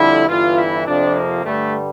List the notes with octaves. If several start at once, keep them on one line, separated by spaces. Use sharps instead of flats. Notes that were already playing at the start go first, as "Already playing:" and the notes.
Already playing: F2 D3 G3 E4
G1 G2 E3 F4
E4
F2 C3 F3 D4
A#3
G2 D3 G3 A3